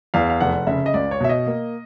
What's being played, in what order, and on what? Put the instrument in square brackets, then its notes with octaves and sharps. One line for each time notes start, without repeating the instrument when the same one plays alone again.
[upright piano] E2 F5
F5
F1 F#5
C#3 E5
D#5
C#2 D5
C#5
B2 E5
D#5
A#3